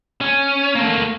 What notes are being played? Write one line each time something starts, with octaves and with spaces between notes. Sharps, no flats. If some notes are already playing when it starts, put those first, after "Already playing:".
C#4
A3 A#3